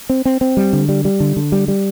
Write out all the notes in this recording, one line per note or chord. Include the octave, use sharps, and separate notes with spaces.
C4
C4
C4
G3
D3
G3
G3
D3
D3
G3
G3